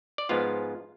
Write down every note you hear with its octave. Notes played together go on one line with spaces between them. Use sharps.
D5
G#2 F3 G#3 B3 F4 F5